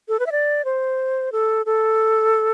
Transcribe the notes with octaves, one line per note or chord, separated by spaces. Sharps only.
A4
B4
E5
D5
C5
A4
A4